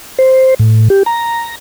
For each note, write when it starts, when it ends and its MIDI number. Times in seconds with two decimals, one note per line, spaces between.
0.19 0.54 72
0.59 0.88 45
0.90 1.03 67
1.06 1.55 82